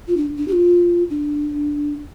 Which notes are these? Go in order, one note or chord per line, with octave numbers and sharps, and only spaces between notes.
F4
D4
D4
G4
F4
D4